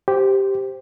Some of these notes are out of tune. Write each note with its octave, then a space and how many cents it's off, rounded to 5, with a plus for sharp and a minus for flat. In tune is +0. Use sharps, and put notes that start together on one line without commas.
G4 +0 C5 +0